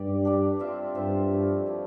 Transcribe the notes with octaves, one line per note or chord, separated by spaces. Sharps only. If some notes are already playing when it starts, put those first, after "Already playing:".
Already playing: G2 G4 D5
D4 G4 D5
C4 F4 C5 E5
G2 C4 F4 C5 E5
F3 A3 E4
F3 A3 E4